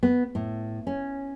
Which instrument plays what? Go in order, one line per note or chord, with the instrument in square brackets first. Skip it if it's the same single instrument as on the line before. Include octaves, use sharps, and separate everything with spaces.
[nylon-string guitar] B3
A2
C#4